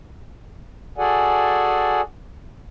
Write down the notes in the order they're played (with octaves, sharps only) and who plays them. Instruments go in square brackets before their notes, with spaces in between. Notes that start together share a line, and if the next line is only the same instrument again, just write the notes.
[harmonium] F#4 G#4 A4 D5 F#5 G#5